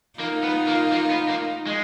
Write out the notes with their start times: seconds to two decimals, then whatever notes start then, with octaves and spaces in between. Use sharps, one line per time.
0.19 A#3 D#4 F4
0.44 B3
0.68 A#3
0.93 A#3
1.11 B3
1.29 A#3
1.67 G#3